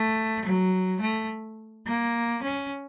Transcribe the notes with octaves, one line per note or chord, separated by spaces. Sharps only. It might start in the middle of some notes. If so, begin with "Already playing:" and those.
Already playing: A3
F#3
A3
A#3
C#4